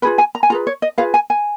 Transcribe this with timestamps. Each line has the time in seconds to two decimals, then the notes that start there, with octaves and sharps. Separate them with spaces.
0.02 F4 G#4 B4 B5
0.18 G#5
0.35 A#5
0.43 G#5
0.50 F4 G#4 B4 A#5
0.67 C#5
0.82 D#5
0.98 F4 G#4 B4 F5
1.14 G#5
1.30 G#5